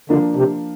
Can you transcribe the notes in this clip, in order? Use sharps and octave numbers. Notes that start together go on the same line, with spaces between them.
D3 F3 A#3 D4
C3